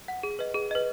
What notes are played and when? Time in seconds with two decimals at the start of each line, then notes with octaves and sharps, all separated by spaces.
0.08 F#5
0.23 G#4
0.39 B4 D#5
0.54 G#4
0.71 B4 D#5